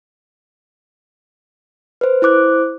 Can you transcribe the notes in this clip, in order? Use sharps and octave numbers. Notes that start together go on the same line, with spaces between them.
B4 C5
E4 C5 D6 F#6